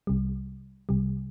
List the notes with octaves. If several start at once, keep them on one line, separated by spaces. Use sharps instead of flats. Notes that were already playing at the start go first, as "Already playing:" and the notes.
C2 C3 G3
C2 C3 G3